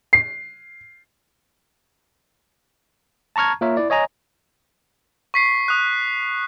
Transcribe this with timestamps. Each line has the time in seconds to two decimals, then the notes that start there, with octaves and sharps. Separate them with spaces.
0.13 C7
3.36 A5 A#5 C#6 F6 G#6
3.61 A#3 F4 A#4 C#5 E5
3.77 E4 D5
3.90 C#5 D#5 G#5 A#5
5.34 C#6 B6 C7
5.68 D#6 F#6